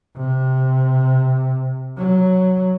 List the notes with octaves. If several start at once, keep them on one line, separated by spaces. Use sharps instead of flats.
C3
F#3